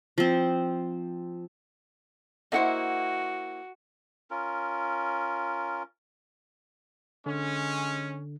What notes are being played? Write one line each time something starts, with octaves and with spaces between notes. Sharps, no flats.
F3 C4
A#3 E4 F#4 C5 D#5 E5 F#5
C#4 F4 A#4
D3 G#3 C#4